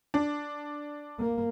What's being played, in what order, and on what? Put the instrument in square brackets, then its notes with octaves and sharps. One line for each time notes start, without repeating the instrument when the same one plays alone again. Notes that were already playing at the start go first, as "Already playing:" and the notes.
[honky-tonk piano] D4
[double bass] A#3